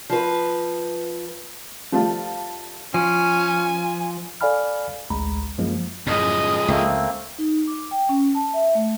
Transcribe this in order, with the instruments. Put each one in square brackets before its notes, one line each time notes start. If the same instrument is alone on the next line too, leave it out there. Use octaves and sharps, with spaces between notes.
[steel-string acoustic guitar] F3 B4
[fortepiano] F3 G3 A3 F4
[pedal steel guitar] F3 [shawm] C#4 [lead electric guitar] G#5
[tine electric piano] A4 D5 F5 G#5 B5 F6
A1 D2 G#3 A#5 B5
F#2 F3 G#3 A#3
[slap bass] F#2 A2 [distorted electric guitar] F3 G#3 [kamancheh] D#5
[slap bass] C#2 [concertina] A3 A#3 C4
[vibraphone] D#4
D6
G5
C#4
A5
E5
A3